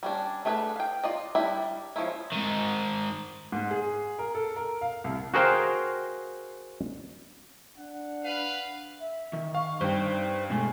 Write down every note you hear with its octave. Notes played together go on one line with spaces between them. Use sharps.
G3 C#4 D4
A3 D4 G#4 A#4 B4
F5 G5
F4 D5 D#5
G3 D4 E4 E5
F3 G#3 C#4 E4
G#2 D#3
G#2
G#4
A#4
A4
A#4
F5
C2
F#4 G#4 A#4 C5 F5 G5
D4 F#5
B4 F5
E5
D#3
F5 C#6
G2 D#4 C5 G5
B2 G#3 A3 G#5